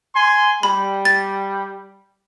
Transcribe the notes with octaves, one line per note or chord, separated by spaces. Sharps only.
G#5 C6
G3 B5
A6